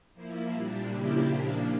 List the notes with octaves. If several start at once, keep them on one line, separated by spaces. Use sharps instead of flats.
F3 A#3 E4
A#2 G3 D4
C#3 F3 A#3 E4 G4
A#2 F3 A#3 D4